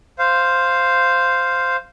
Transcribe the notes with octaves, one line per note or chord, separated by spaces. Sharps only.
C5 F5